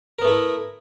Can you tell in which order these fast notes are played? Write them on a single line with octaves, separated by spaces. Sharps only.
A#4 B3 A3 E4